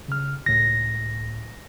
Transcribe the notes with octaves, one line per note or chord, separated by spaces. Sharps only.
C#3 F6
C#2 A2 A#6